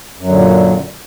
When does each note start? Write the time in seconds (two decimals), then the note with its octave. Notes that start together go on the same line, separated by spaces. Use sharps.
0.19 F#2
0.23 F#3
0.28 D3
0.32 A#2